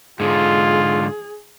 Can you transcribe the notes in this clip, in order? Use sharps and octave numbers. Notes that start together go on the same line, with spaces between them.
G#2 D3 F4 G#4